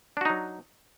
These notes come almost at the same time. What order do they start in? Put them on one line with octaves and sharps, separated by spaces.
D4 F#4 D#4 F#3